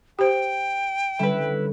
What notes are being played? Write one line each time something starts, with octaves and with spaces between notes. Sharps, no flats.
G4 C5 G5
D3 G3 C#4 E4 B4